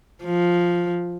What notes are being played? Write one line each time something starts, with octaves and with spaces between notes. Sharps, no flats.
F3